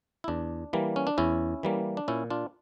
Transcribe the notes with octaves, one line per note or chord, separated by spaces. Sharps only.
E4
E2 D4
E3 G3 A#3
C#4
D4
E2 C#4 E4
E3 G3 A#3
D4
A#2 C#4 E4
D4 F4